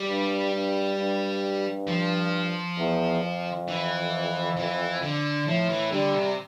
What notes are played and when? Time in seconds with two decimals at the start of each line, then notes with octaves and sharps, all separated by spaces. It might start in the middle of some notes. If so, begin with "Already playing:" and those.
Already playing: G3
0.08 G2
0.52 G2
0.98 G2
1.88 F3
2.78 E2
3.22 F2
3.68 E3
4.57 E3
5.02 D3
5.47 A2 F3
5.69 E3
5.92 D3 G3
6.14 C3